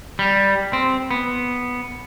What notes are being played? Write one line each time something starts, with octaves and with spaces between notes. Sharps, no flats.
G3
C4
B3